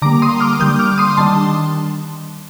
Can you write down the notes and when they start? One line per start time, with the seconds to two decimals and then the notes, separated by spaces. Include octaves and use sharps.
0.02 D3 G3 A#3 A#5 D6
0.22 C6 D#6
0.40 D6 F6
0.59 D3 G3 A#3 D#6 G6
0.79 D6 F6
0.98 C6 D#6
1.17 D#3 G3 D4 A5 C6